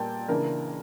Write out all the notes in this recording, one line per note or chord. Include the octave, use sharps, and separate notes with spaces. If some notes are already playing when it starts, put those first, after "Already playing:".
Already playing: A#2 G3 A#3 G5 A5
C#2 C#3 E3 A#3 D4 A#4